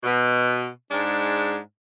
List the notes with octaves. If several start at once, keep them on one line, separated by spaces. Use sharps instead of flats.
B2
G#2 G#3 D4